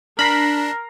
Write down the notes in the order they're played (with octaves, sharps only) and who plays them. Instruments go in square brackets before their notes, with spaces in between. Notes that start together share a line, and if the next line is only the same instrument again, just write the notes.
[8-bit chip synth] D4 [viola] A#4 [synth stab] B5 [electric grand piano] F6 A#6 C7